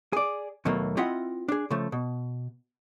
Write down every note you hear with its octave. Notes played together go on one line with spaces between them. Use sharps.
G#4 D5
D#2 B2 F#3 A3 A#3
C4 E4 F4 D#5 E5 F#5
D4 G#4
C#3 F3 A3
B2